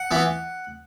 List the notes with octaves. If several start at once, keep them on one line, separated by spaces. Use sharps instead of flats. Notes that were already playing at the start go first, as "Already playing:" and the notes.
Already playing: F#5
E3 B3